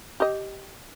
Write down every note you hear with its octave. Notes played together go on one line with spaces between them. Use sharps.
G4 D#5